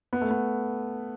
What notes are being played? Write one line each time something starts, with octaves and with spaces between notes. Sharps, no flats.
B3
A3
B3